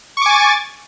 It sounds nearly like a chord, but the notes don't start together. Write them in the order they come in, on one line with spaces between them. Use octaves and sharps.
C#6 D6 G#5 A6